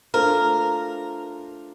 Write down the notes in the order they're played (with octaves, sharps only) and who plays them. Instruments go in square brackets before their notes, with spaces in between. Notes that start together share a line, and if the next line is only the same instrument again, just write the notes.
[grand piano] A3 D4 F4 A4 C5 [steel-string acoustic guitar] A#4